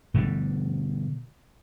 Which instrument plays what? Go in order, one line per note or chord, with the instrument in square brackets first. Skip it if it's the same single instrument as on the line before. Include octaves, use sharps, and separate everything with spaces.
[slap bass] B2 D3 G3